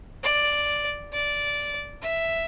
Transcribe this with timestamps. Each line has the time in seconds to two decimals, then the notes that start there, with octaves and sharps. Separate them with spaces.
0.23 D5
1.13 D5
2.02 E5